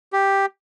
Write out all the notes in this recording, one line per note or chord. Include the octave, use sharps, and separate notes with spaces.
G4